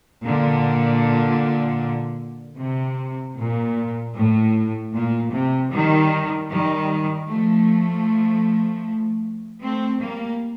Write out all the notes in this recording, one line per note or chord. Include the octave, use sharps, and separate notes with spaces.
A#2 D3
C3
A#2
A2
A#2
C3
D#3 G3
D#3 G3
F3 A3
A3 C4
G3 A#3